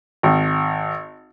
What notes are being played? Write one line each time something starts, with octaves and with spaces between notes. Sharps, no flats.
G#1